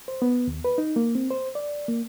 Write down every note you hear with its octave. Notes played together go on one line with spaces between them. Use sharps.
C5
B3
D#2
B4
D#4
A#3
C4
C5
D5
A#3